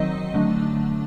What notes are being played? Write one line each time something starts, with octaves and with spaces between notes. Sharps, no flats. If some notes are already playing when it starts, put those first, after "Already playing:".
Already playing: D#3 F#3 C4 D#4 D#5
D3 F#3 A3 D4